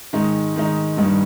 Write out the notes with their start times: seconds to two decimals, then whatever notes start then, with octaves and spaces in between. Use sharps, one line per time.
0.13 G#2 D#3 G#3 D#4
0.56 D#3 G#3 D#4
0.97 G2 D#3 G3 A#3 D#4